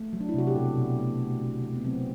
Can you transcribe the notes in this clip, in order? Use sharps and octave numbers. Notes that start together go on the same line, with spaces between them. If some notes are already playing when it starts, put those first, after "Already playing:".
Already playing: A3
F#3
D4
E4
C3 F#4
G4
B2 A4
B2
A3
A3
D3
A3
B3
F#3 C4